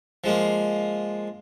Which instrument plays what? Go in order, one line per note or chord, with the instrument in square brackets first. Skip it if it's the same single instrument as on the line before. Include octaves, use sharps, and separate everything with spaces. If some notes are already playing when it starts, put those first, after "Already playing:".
[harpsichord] F3 G#3 A#3